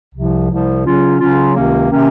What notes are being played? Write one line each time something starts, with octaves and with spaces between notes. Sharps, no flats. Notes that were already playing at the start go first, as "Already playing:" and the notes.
C2 C3 F3
C2 C3 F3
C#3 F#3 C#4 F4
C#3 F#3 C#4 F4
C#2 C3 D#3 A#3 C#4
C3 D#3 A#3 C#4